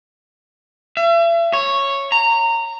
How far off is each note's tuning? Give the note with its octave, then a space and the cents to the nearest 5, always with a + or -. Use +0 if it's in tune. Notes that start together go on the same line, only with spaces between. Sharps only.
E5 +40
C#5 -5
A#5 -20